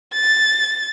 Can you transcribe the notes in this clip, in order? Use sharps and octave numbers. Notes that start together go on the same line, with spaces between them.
A6